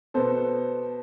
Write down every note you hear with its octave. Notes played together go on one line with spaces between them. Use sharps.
B2 B3 A4 C5